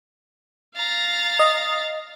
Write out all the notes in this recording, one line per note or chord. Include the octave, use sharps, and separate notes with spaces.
F5 A#5 A6
D#5